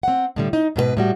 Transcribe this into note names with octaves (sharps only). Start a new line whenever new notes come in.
C4 F#5
A2 D3 G3
D#4
G#2 B2 G#4 B4
A2 G3 F#4